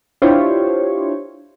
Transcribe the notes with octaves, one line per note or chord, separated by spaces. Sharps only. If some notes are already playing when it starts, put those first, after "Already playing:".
D4 E4 F4 G4 C5 C#5